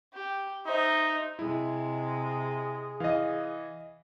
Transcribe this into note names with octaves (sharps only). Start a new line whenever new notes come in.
G4
D#4 C5 E5
C3 G#3 E4 G#4
E3 D#5 F5